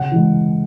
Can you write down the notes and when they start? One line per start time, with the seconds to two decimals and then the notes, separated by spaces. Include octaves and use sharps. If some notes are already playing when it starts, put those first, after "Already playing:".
Already playing: C#3 F#5
0.11 E3 G#3